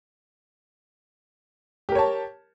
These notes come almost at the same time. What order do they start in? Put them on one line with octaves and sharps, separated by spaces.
G4 A#4 C#5 A5